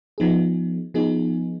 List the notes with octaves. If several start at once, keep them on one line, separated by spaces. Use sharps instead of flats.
F3 B3 D#4 G#4
F3 B3 D#4 G#4